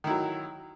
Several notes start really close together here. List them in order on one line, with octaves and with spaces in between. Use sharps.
D#3 E4 F#3